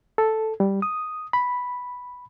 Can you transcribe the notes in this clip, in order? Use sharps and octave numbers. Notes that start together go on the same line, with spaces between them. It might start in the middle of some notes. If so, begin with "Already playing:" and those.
A4
G3
D#6
B5